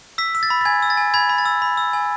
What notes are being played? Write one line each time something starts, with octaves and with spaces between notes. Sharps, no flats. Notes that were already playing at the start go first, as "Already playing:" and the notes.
E6 B6
E6
A6
B5
A6
G#5 G#6
E6
A6
G#5
B5 G#6
B5
A6
E6
B5
E6
G#5